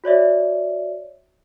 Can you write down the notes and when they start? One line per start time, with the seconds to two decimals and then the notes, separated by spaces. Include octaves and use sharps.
0.04 F#4 C#5 D5 E5